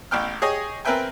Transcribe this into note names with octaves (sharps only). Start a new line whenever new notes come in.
A1 A2 G5 F6
G4 G#4 C#5 D#5 G#5
C4 A#4 B4 E5 G5 G#5